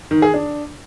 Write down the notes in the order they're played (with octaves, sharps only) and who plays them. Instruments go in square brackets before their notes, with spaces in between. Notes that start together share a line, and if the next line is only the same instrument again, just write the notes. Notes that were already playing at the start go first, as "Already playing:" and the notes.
[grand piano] D#3
G#4
D4